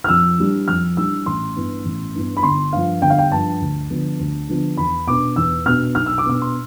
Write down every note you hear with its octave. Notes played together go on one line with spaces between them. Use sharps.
F6
F2 E6
E3 G3 D4
F2 F6
E3 G3 D4 E6
A1 C6
G2 E3 B3
A1
G2 E3 B3
B5
G1 C6
G2 F3 F5
G1 G5
F5
G5
G2 F3 A5
D2
D3 F3 B3 D4
D2
D3 F3 B3 D4
E2 B5
B2 B3 D4 D6
E2 E6
B2 B3 D4 F6
B1 F6
E6
D6
B2 B3 D4 E6
C6